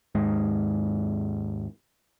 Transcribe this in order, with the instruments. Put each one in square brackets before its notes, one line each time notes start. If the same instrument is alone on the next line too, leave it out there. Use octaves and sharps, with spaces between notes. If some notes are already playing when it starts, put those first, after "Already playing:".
[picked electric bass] D#2 G#2 G#3